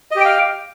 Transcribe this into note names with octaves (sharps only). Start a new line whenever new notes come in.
G4 D#5 F5 G5